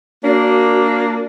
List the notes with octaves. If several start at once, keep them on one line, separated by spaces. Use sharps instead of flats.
A#3 D4 F#4